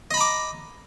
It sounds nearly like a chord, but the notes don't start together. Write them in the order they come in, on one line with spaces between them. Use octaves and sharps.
D#5 B5 A#5 D6